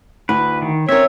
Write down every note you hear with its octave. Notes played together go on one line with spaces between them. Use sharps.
D2 E4 B4
D#3
C4 C#4 A#4 C#5 E5